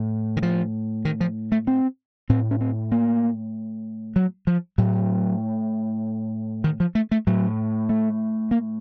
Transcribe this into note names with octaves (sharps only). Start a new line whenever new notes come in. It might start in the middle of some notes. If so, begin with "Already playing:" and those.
Already playing: A2
D#3
F3
D#3
F3
A3
C4
A2 C4
C#4
C4
A#3
F#3
F3
A2 F#3
D#3
F3
A3
A3
A2 F#3
A3
A#3